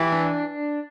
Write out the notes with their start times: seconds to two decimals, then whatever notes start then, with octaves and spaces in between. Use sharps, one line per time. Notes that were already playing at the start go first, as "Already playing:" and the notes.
Already playing: E3 G4
0.12 D4